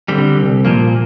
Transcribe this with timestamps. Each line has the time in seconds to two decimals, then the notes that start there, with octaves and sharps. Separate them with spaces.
0.08 D3 G3 C4
0.37 C2
0.65 A#2 F3 A#3